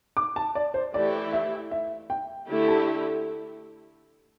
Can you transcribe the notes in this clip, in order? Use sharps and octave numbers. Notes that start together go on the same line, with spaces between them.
D6
A5
D5
C5
E3 A3 E4 G4 D5
E5
E5
G5
D3 A3 E4 G4
A5